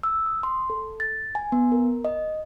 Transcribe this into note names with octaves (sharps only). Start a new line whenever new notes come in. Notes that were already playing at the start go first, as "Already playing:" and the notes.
E6
D#6
C6
A4
A6
G#5
B3
A#4
D#5